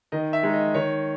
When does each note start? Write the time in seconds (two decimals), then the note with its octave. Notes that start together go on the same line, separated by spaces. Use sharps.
0.12 D#3 D#5
0.33 E5
0.43 G#3 D#4
0.54 D#5
0.74 D#3 C#5